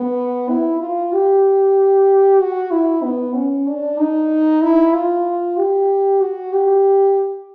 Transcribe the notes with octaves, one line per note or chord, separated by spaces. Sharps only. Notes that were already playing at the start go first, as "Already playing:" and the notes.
Already playing: B3
E4
F4
G4
F#4
E4
B3
C#4
D4
D#4
E4
F4
G4
F#4
G4